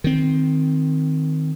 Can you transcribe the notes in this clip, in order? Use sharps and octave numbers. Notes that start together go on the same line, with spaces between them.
D#3 C4